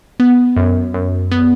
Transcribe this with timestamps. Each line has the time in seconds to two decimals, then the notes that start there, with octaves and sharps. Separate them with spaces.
0.20 B3
0.57 F#2
0.94 F#2
1.31 B3